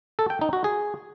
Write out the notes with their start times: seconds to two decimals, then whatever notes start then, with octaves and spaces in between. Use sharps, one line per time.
0.19 A4
0.30 G5
0.41 D#4
0.53 F#4
0.64 G#4